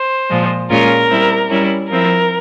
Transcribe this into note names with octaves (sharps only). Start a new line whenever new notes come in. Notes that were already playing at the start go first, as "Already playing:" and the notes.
Already playing: C5
A#2 F3 G#3
A#2 G#3 C#4 F4 A#4
G3 C4 E4
G3 C#4 E4
F3 C4 E4 A#4